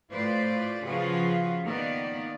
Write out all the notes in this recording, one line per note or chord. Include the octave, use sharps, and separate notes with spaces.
A2 F4 B4 C5 D5
C#3 F3 F4 F#4 G#4 B4
D#3 A#3 B3 D5